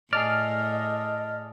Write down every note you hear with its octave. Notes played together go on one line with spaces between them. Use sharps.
A2 G#4 A4 D5 D#5 F6